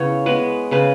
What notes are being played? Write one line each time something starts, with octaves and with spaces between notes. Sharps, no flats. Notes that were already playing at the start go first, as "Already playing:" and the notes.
Already playing: C#3 B3 E4 C#5
G#3 B3 B4
C#3 B4